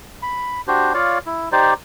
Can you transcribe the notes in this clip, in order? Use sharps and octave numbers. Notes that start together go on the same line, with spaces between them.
B5
D4 F#4 G4 C5
F4 C#5 D5 F5
E4
D#4 G4 C5 D5